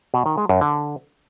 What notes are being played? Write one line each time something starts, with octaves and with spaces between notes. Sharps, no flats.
B2
D#3
G#3
F#2
D3